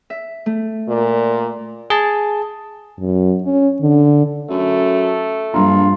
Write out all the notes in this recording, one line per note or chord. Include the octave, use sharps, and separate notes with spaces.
E5
A3
A#2
G#4 A5
F#2
C#4
D3
F#2 A3
A#1 G2 F4 A#5